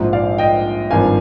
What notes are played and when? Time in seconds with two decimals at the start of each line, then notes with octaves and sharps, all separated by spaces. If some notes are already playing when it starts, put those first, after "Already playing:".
Already playing: A#1 G#2 F3
0.13 D5 F5
0.38 D#5 G5
0.91 G#1 G2 F3 F5 G#5